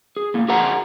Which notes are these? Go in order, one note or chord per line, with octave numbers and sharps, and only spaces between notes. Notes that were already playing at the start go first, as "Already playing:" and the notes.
G#4
A2 A#3
F#4 G#4 A#4 C5 F#5 A#5